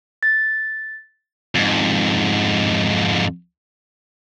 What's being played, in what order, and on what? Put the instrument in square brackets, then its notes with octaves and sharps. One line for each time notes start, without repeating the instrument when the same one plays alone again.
[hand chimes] A6
[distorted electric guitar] F2 G#2